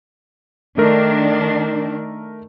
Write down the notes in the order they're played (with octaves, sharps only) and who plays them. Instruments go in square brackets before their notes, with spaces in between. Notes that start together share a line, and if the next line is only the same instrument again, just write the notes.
[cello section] D#3 D4 [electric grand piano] A3 A#4